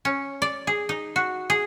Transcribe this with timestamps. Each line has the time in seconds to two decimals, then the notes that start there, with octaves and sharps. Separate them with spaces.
0.05 C#4
0.42 D5
0.67 G#4
0.89 D#4
1.16 F#4
1.50 G#4